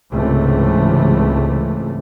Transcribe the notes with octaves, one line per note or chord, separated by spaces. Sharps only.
C#2 G#2 C3 E3 A3